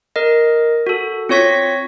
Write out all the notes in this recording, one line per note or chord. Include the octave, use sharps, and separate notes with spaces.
A#4 D#5
F#4 A4
C4 F4 C#5 C#6 A#6 B6